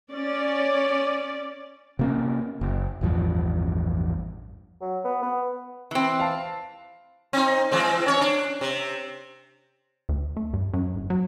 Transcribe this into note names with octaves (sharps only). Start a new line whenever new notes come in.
C#4 D5
C3 A#3 C#4
F#1
A1 E2 G2 F3
F#3
B3
B3
E3 C4
F5 A5
C4 D#4
E3 G#3 C4
C#4 C#5
D4
C3
D2
A3
G2
F#2
G1
F#3